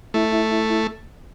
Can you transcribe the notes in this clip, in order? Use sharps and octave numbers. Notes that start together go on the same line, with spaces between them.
A3 E4
E4
E4
E4